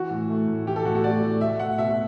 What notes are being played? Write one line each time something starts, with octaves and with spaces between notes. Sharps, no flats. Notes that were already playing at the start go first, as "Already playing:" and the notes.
Already playing: E3 F#4
A2
A3
A2
E3 G4
A4
A2 F#4
F#4
A3 D5
A2
A3 E5
A3 F#5
B2 E5